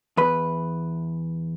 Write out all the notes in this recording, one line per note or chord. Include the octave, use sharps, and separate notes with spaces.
E2 B4